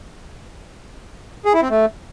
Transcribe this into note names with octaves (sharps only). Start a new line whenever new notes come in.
G#4
E4
C4
A3